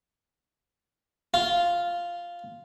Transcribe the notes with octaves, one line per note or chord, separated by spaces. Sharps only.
F4